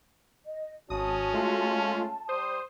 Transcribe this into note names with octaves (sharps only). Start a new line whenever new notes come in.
D#5
G#1 C#4 F#4 A5 D#6
G#3 A3 F4
G3 C5 D#6